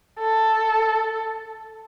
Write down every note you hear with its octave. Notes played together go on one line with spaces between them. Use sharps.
A4